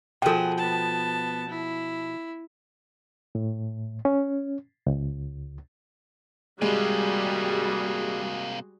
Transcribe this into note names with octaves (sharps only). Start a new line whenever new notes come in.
B2 F3 G#4 A4 G5
B3 A5
E4
A2
C#4
C#2
C3 G3 G#3 A#3 F#4 G#4